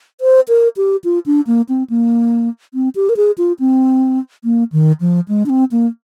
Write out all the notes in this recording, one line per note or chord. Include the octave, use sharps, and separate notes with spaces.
C5
A#4
G4
F4
D4
A#3
C4
A#3
C4
G4
A#4
G#4
F4
C4
A#3
D#3
F3
G#3
D4
C4
A#3